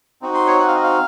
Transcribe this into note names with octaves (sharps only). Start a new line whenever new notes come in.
C4 D#4 F#4
C6
C#5
F#5
F5
D#5
F5